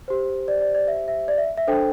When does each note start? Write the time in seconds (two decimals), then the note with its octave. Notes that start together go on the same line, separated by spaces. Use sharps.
0.08 G4 C5
0.48 D5
0.61 D5
0.75 D5
0.88 E5
1.08 E5
1.28 D5
1.38 E5
1.57 E5
1.67 D4 A4 C5 G5